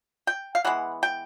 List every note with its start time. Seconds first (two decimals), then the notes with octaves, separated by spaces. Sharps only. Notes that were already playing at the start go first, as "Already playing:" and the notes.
0.27 G5
0.55 F5
0.65 E3 G#3 B3 F#5
1.03 G5